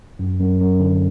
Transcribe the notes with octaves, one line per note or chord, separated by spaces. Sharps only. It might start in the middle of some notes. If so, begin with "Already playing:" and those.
F#2
F#2
F#2
D3